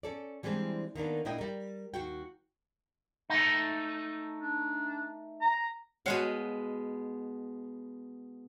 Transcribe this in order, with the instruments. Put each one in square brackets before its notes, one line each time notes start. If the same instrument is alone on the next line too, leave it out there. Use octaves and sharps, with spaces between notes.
[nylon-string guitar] C#4 A4 D5
E3 G3 G#3 C4 D4
D#3 A#3 B3 D4
A#2 D4 E4 D#5 G5
G3 A#4
D#2 F#4 G5
[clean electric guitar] A3 D#4
[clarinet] D4
A#5
[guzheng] B2 G#3 F5 [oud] F#4 C#5